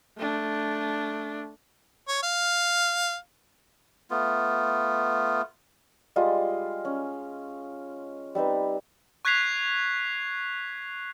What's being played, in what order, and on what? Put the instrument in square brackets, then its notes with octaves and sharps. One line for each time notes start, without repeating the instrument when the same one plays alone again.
[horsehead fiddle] A3 D4
[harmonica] C#5
F5
[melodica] A3 B3 F4
[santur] G3 G#3 F4 D#5
C#4
G3 C4 D#4 B4
[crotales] C#6 F#6 G#6 B6 C7 F7